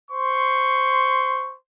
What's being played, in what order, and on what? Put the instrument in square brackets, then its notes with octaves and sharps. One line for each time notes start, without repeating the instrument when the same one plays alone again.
[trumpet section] C5 C6 C#6